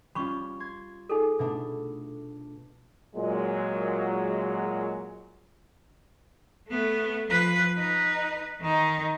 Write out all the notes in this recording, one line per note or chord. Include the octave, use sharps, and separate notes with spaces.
G3 C#4 F4 B5 C#6
C6 G#6 A6
D#4 G#4 A4
B2 A3 D4
A#2 F#3 G#3
A3 B3
F3 B4
D#4 B4
D#3 D#4